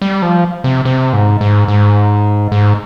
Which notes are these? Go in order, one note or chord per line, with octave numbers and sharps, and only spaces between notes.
G3
F3
C3
C3
G#2
G#2
G#2
G#2